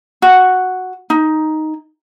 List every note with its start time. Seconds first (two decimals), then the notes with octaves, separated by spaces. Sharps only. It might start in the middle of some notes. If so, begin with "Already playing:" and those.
0.22 F#4
1.10 D#4